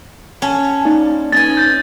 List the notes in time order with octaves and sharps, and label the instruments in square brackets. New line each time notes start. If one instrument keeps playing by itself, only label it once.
[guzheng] C#4 [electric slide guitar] F#5 G#5 [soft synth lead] A5
[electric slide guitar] A#3 D5 [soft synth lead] D#4
[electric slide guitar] C#4 B4 [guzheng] D#5 G#5 [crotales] A6
[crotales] G6 A6